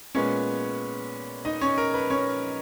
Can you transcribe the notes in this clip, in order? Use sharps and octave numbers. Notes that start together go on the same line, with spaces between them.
A#2 G#3 B3 C#4 C#5
D#4 D#5
C#4 C#5
A#4
B4
C#4 C#5